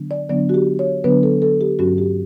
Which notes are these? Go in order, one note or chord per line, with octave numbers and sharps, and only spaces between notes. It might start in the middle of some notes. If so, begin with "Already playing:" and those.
Already playing: D3 F#3 B3 D4
D5
D3 F#3 B3 D4 D5
F#4
G4
C#5
D3 F#3 B3 D4 B4
A4
A4
G4
G2 F#3 C#4 F#4
G4